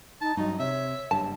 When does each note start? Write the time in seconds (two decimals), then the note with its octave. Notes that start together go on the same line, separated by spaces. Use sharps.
0.21 D#4 A5
0.37 G2 F#3 D#4 D#5
0.60 C3 C#5 E5
1.11 F#1 G2 A5